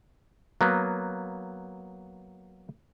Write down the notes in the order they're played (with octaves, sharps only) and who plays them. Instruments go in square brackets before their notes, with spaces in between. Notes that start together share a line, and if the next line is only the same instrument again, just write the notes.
[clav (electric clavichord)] F#3 A#3 B3